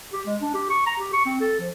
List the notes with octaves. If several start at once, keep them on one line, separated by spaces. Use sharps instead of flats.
G4
G#3
D4
G4
C#6
A#5
G4
C#6
C4
A4
F3